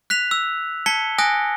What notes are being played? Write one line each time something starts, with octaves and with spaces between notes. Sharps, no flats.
F#6 B6 F7
E6
A5 G#6 B6 C#7 G7
G#5 D#6 F#6 A#6